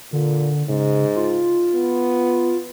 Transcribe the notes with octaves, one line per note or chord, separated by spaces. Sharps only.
A#2 D3
G#2 C#3
F4
B3